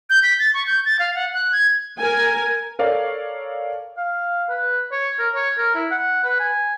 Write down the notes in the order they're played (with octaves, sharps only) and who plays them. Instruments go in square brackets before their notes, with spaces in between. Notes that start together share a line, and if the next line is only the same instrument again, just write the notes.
[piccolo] G6
B6
A6
C#6
G6
A6
F5
F#5
F#6
G#6
[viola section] A#4 G#5
[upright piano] A4 A#4 C#5 D5 F5
[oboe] F5
B4
C#5
A#4
C#5
A#4
E4
F#5
B4
G#5